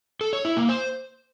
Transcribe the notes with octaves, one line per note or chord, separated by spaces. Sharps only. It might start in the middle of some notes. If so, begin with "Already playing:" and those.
A4
C#5
E4
A#3
C5